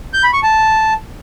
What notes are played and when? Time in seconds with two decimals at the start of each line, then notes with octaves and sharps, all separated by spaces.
0.14 G6
0.23 B5
0.33 C#6
0.43 A5